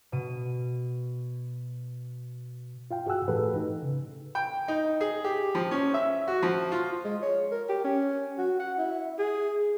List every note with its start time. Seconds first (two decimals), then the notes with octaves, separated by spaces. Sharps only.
0.12 B2 D#7
2.91 F4 F5 G5
3.06 F#4 G#4 F#5 G#5 E6 F#6
3.28 A2 E3 A3 G4 A4 B4
3.56 D#4
3.83 C#3
4.35 G5
4.68 D#4
5.01 G#4
5.24 G4
5.55 F3
5.71 C#4
5.94 E5
6.28 F#4
6.42 F3
6.72 F4
7.05 G#3
7.22 C#5
7.51 A#4
7.69 G4
7.84 C#4
8.38 F#4
8.60 F#5
8.78 E4
9.18 G#4